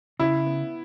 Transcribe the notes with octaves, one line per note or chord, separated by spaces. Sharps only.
C#3 E4
B3